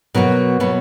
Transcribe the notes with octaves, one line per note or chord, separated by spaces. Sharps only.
B2 F#3 B3 A#4
B2 F#3 B3